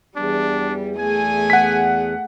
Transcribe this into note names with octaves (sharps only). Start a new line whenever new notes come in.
E2 G3 D4
A3 G#4 G#5
F#5 B6